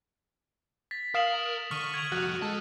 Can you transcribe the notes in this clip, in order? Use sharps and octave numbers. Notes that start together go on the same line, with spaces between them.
A6 B6
A#4 F5 D#6 E7 F#7
D3 C#6 F6 D#7
G#6 D7 F7
C2 F2 F#4 F#6
G#3 A4 A5